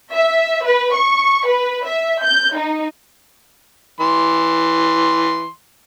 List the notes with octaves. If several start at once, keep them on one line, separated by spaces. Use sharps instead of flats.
E5
B4
C#6
B4
E5
G6
D#4
E3 C6